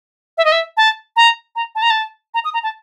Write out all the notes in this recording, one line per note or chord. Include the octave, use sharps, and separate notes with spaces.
E5
D#5
E5
A5
A#5
A#5
A5
A#5
A5
A#5
D#6
A#5
A5